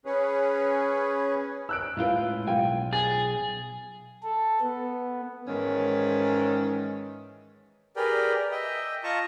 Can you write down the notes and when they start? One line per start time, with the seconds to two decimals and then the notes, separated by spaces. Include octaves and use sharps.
0.05 C#4 G#4 B4 C#5
1.69 E6 F#6 D7
1.97 A2 G#3 E4 F4 B4 G5
2.47 B1 F4 G5 G#5
2.93 G#4 A6
4.23 A4
4.61 B3
5.47 G#2 D#3 E3 C#4
7.96 G4 G#4 A#4 B4 D5 G5
8.51 D#5 E5 G5
9.03 F4 D#5 A5 A#5 C#6